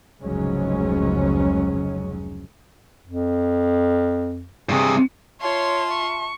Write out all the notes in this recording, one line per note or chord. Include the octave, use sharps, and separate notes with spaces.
F1 C#2 G#2 F#3 G#3 C#4
F2
G2 C3 G#4
F4 C#5 E5 A5 C6
C#6